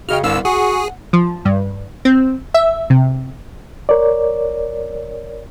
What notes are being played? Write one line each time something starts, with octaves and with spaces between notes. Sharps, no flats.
C#3 F#4 D#5 G5 F6
G1 C2 B3 F5 E6
F#4 G#4 F#5
F3
G2
C4
E5
C3
A#4 C#5 D5